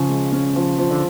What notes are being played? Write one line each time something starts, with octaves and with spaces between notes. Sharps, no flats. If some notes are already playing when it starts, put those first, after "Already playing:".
Already playing: C#3 F3 C#4
G#3
C#4
F3
F3
D3